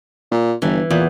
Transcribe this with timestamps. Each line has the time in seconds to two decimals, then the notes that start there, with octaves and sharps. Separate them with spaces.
0.32 A#2
0.62 G1 E3
0.90 E2 A#2